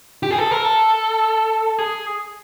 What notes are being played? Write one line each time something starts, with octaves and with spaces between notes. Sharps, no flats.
G4
G#4
A4
A#4
A4
G#4